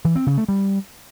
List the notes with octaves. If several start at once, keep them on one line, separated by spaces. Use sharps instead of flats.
E3
C4
C#3
A3
G3